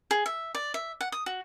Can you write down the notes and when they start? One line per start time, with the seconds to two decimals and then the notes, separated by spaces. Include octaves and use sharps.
0.11 G#4
0.26 E5
0.55 D5
0.74 E5
1.01 F#5
1.12 D#6
1.26 F#4